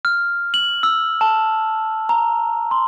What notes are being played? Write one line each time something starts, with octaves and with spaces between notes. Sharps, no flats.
F6
F#7
E6
A5
A#5
C6